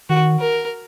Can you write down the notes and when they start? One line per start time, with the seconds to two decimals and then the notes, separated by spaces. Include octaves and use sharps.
0.10 D#3 F#4
0.40 A#4